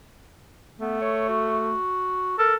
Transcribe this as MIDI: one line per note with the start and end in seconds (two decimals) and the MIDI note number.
0.80 1.75 57
0.80 0.98 59
1.01 1.27 73
1.29 2.36 66
2.38 2.55 69
2.38 2.54 70